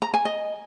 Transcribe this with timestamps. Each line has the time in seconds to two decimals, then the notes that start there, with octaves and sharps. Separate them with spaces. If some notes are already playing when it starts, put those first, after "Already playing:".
0.02 A#5
0.14 G#5
0.25 D#5